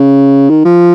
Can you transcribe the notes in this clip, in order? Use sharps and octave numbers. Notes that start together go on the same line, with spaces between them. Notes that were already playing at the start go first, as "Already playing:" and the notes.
Already playing: C#3
D#3
F3